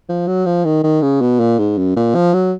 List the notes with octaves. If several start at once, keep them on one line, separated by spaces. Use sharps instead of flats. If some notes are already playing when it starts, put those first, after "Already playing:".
F3
F#3
F3
D#3
D#3
C#3
B2
A#2
G#2
F#2
A#2
F3
F#3